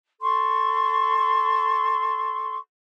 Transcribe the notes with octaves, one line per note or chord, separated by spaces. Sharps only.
A4 C6 C#6